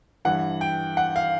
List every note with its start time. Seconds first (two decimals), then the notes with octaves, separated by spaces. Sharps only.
0.25 G2 E3 F#5
0.61 G5
0.97 F#5
1.16 F5